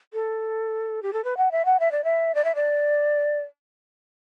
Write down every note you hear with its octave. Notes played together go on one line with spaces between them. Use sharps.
A4
G4
A4
B4
F#5
E5
F#5
E5
D5
E5
D5
E5
D5